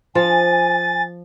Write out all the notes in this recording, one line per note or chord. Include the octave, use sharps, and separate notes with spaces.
F3 G#5 A6